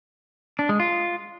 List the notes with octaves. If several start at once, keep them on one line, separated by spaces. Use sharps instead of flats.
D4
G#3
F4